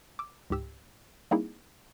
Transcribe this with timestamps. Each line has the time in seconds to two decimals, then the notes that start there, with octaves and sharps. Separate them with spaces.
0.19 D6 E6
0.50 C#2 G#2 G4 E6
1.31 G3 A#3 C4 D#4 E4 G#4